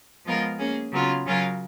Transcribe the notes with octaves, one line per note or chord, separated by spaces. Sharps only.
F3 G#3 B3 F4 A#4
A#3 C#4 G#4
C#3 F#3 B3 F4
C#3 F#3 C#4 F4 A#4